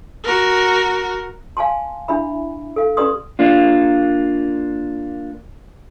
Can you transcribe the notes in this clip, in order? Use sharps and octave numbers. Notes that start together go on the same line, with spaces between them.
F#4 A#4
F5 G#5 A5 C6
D4 E4 E5 B5
A4 F5
C#4 G4 B4 D5 C6 D#6
A#3 D4 F4